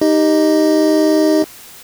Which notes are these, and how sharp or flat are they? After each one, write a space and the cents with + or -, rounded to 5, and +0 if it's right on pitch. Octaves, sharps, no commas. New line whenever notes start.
D#4 +0 G4 +0 D#5 +0